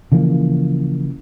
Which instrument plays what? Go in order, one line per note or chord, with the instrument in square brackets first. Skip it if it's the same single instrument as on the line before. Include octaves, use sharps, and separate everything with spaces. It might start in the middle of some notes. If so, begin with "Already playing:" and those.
[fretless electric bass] C#3 E3 F3 A#3